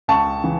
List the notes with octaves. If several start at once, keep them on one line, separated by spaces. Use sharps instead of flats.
C#2 A5 C#6
C#3 E3